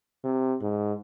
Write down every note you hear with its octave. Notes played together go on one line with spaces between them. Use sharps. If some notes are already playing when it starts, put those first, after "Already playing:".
C3
G#2